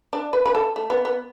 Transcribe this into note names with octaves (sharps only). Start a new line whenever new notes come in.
D4
B4
B4
A4
A3
B3
B3